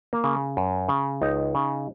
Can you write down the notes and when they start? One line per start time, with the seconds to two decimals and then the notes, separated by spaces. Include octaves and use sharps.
0.13 A#3
0.24 C#3
0.57 F#2
0.89 C#3
1.22 C#2 D#4
1.55 C#3